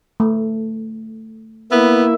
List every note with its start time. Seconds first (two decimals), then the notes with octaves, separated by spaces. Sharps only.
0.20 A3
1.72 A#3 B3 E4 E5